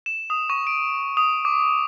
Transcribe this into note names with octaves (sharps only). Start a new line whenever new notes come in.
E7
D#6
C#6
D7
D#6
D6